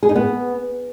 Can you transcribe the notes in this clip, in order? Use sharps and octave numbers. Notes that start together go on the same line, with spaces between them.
G#4
D#4
B3